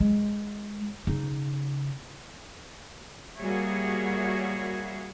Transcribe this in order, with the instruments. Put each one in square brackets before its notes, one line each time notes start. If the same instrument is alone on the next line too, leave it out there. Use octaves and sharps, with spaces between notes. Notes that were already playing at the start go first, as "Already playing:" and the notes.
[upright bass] G#3
C#3 D#4
[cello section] G3 A#3 F#4 G#4 C#5 E5